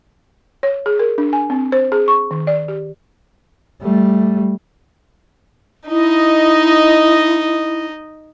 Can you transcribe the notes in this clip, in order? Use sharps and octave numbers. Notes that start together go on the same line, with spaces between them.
C#5
G#4
A#4
D4
G#5
C4
C5
G#4
C#6
D#3
D5
G4
G3 A3
D#4 E4 D#5